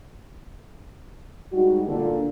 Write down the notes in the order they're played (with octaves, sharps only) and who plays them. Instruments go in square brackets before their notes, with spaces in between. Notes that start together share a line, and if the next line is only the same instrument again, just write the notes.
[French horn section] G#2 G3 D#4 F#4
A#2 D3